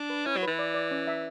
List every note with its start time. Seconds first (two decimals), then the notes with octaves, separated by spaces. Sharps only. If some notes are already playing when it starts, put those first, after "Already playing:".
Already playing: D4
0.10 B4
0.25 C#4 E4
0.37 F#3
0.43 E3 B4
0.59 D5
0.74 D5
0.91 C#4
1.07 E5